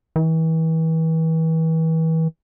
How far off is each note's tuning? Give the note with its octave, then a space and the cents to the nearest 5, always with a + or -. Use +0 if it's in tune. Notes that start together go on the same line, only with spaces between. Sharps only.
E3 -35